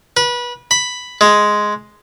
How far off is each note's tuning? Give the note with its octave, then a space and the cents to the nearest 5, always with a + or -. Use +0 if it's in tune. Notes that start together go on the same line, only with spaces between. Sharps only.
B4 -25
B5 +5
G#3 +5